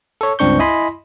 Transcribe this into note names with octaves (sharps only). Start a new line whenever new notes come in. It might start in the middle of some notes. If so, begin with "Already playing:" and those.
A4 C#5
C#2 G2 C4 D4 C#6 G6
E4 D#5 G#5 B5 C6